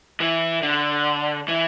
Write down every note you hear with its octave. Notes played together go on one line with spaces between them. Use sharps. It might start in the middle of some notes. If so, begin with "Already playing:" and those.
E3
D3
E3